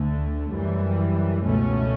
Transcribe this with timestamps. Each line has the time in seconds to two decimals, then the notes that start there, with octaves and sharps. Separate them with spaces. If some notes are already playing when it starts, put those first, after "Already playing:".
Already playing: D2 D3 A3
0.52 F#2 E3 G3
1.44 C#2 B2 A3 C#4